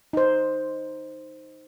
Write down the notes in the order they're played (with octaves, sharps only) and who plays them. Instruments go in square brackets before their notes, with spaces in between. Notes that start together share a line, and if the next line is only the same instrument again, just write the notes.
[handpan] D#4 C5